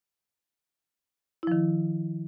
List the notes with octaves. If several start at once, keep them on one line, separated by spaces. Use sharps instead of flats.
D#3 F3 E4